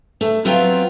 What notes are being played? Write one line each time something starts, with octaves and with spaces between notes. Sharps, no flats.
A3
F3 F#3 B3 C4 F4